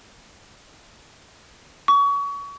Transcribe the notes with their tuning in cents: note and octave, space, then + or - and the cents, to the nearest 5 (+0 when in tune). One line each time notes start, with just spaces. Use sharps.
C#6 +30